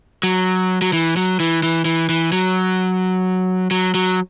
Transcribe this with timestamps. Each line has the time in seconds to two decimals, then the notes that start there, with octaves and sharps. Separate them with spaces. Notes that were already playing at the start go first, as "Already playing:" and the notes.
0.23 F#3
0.82 F#3
0.93 E3
1.17 F#3
1.40 E3
1.63 E3
1.85 E3
2.09 E3
2.32 F#3
3.71 F#3
3.95 F#3